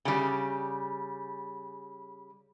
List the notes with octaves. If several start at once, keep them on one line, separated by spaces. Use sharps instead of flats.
C#3 G3